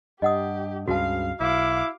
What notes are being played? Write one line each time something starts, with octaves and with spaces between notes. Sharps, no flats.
G2 G4 D#5 F#5 D#6
C#2 G2 C#3 F#4 F5 A5
B1 E4 F5 D6